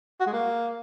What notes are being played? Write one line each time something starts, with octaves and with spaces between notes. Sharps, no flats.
F#4
G#3
A#3